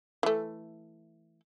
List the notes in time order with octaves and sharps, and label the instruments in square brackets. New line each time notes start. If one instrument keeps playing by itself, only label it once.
[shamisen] E3 A3